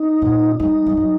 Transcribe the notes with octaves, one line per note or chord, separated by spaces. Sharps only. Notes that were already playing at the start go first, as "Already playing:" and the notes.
Already playing: D#4
A#2
G3 D#4
G3
F#3